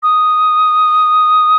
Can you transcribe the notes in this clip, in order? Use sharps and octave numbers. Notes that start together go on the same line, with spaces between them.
D#6